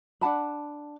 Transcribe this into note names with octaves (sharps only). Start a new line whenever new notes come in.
D4 F#5 A5 B5